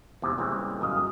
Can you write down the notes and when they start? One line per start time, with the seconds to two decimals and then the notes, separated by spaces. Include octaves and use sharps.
0.22 E2 G#2 C3
0.38 A#2 C#3 E3 G3 G#3 C4
0.81 G1 F#2 D#5 F5